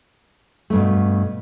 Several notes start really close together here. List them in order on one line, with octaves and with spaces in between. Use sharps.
A3 G2 B2